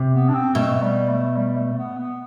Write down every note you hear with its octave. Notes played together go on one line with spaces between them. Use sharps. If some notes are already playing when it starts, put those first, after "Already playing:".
Already playing: C3
B3
D4
C4
B2 A3
A3
G3
A3
G3
A3
B3
B3